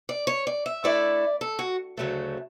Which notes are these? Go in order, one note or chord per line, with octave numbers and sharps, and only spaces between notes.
D5
C#5
D5
E5
D3 A3 E4 D5
A4
F#4
D2 C#3 F#3 A3